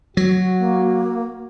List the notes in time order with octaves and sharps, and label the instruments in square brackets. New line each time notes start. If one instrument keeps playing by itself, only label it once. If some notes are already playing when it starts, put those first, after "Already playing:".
[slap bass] F#3 [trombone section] F#4
[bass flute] A#3